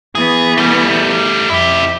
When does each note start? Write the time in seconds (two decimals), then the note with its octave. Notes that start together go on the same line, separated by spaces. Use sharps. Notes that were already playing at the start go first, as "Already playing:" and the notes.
0.15 E3 B3 G#4
0.57 G3 A3
1.50 F2 E4 G4 E5